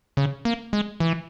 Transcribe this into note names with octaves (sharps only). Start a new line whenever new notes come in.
C#3
A#3
G#3
E3